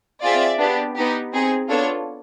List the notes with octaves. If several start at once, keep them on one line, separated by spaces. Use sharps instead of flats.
C4 F4 G#4 D5 E5
B3 D4 G4
B3 D#4 G4
C4 D#4 G#4
B3 D4 F4 A4 C#5